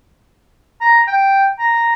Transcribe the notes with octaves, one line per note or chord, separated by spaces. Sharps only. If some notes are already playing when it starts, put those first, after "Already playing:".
A#5
G5
A#5